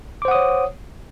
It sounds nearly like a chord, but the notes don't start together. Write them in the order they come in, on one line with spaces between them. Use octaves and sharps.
D6 C5 F#5 D#6 C#5